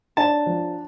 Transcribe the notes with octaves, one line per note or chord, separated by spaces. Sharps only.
D4 A5
F3